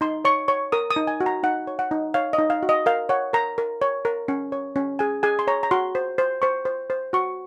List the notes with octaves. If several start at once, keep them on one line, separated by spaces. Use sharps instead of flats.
D#4 C6
C#5 C#6
C#5 C#6
A#4 D#6
D#6
D#4
G#5
F#4
A#5
D#4 F#5
C#5
F#5
D#4
C#5 F5
D#5
D#4
F5
F#4
D#5
A#4 F5
C#5 F#5
A#4 A#5
A#4
C#5
A#4
C#4
C#5
C#4
G#4 G#5
G#4 G#5
C6
C#5 A#5
A#5
F#4 C6
C5
C5
C5 C#6
C5
C5
F#4 C#6